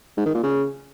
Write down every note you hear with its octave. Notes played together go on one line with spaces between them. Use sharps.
G#2
D#3
A#2
C#3